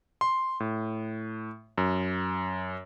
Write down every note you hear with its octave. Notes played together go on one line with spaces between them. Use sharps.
C6
A2
F#2